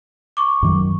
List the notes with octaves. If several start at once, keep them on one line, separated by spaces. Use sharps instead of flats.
C#6 D6
F#2 D#3 F#3